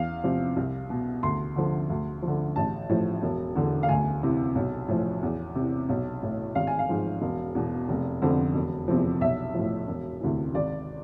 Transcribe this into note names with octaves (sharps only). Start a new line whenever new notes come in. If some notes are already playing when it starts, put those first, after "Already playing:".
Already playing: E2 F5
C3 F3
C2
B2
D2 C6
D3 F3
D2
F3
D3
A1 A5
A2 F3
E1
E2 D3
F5
D2 G#5
C3 E3
B1
A2 F3
E2
C3
E3
B1
A2 E3
G#1 F5
G#5
F5
G#2 F3
E1
E2 B2
F1
F2 D3 F3
E1
E2 C3 F3
B1 E5
A2 F3
E1
D2 C3 E3
G#1 D5